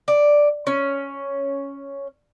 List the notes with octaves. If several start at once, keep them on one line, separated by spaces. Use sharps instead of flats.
D5
C#4